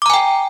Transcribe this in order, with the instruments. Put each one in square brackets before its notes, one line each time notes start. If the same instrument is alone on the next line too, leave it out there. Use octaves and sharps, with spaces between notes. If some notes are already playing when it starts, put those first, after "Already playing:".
[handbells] D6
A#5
G#5
G5